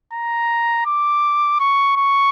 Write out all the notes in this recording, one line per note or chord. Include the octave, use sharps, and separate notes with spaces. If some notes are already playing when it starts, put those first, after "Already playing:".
A#5
D6
C#6
C#6